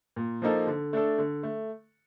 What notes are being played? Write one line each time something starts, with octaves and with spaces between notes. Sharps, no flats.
A#2
F3 A#3 D#4 A4
D3
A3 D4 A4
D3
A3